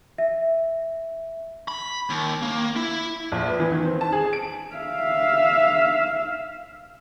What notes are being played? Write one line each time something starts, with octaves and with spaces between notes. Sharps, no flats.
E5
B5
D#2
A#3
E4
A#1
B4
E3
D#3
C4
A5
G#4
D7
E5 F5